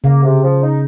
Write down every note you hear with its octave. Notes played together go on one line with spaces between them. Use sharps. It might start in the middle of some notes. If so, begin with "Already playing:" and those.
C#3 A#3
C3
F3
D#4